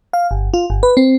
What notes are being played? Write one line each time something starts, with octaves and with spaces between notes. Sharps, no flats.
F5
G1
F4
G1
B4
C4